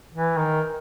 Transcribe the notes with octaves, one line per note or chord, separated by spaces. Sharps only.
E3
D#3